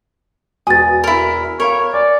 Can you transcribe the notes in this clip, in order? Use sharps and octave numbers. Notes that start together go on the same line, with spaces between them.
E1 F#4 B4 G#5 D#6 A6
E4 A#4
A#4 C#5 F5 B5 C#6
D5 G#5